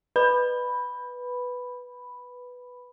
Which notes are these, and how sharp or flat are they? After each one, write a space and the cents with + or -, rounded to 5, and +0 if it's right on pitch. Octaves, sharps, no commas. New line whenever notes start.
B4 +0 B5 +0